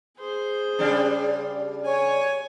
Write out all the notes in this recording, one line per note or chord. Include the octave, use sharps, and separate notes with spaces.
G#4 C5
C#3 G3 D4
C#5 G#5